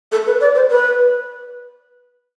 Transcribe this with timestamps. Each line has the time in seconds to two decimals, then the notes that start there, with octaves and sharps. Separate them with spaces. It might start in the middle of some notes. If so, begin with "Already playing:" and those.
0.12 A4
0.26 B4
0.41 D5
0.55 C5
0.70 B4